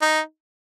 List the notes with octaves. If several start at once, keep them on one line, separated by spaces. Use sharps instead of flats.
D#4